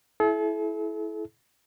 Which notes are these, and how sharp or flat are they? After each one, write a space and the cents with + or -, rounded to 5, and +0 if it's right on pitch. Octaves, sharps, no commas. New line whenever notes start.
E4 +0 A4 -45